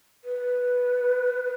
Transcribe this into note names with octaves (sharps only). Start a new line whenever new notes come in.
B4